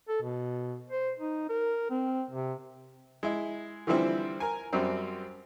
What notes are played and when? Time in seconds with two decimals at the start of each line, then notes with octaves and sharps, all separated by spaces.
0.08 A4
0.22 B2
0.90 C5
1.19 D#4
1.49 A#4
1.90 C4
2.31 C3
3.23 G#3 E4
3.87 D3 E3 F3 G3 C4 E4
4.40 A#4 G#5
4.73 F#2 F#3 G3 C4